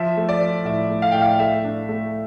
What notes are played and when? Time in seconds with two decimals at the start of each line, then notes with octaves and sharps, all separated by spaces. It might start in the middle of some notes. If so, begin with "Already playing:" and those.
Already playing: F3 E5
0.17 A3
0.29 D5
0.41 F3
0.65 A2 E5
0.90 A3
1.02 F5
1.12 A2 G5
1.21 F5
1.39 A3 E5
1.64 D4
1.89 A3